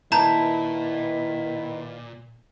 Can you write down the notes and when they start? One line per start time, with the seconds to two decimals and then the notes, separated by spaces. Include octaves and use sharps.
0.12 A#2 D#3 E4 B4 A5 A#5 G6